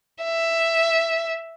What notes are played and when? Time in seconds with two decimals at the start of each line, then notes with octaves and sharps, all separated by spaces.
0.24 E5